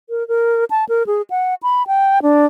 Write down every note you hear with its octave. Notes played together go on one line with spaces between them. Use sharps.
A#4
A#4
A5
A#4
G#4
F#5
B5
G5
D4